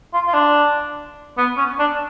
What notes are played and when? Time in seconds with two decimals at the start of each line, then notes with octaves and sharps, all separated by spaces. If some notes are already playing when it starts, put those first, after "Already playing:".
0.13 F4
0.27 F4
0.34 D4
1.38 B3
1.57 C#4
1.79 D4